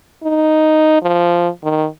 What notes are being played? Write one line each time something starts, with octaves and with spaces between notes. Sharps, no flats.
D#4
F3
D#3